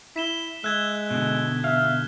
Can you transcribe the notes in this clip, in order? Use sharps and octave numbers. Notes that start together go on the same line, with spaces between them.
E4 B6 E7 G7
G#3 E5 F#6 G#6 G7
B2 D3
E5 F5